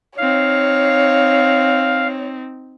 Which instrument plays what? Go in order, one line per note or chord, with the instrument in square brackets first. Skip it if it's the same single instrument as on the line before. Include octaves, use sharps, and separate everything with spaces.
[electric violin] C4 D#4 [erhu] C#5 [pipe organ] F5